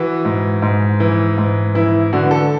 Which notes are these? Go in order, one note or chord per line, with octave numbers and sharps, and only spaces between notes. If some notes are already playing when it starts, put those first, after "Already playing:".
Already playing: E3 F#4
G#2
G#2
E3
G#2
E3 E4
D3 F#4
B4
A4